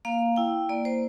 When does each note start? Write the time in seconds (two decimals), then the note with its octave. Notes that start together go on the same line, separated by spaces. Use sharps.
0.05 A#3 F5
0.36 E4 G5
0.69 A#3 D5
0.85 C5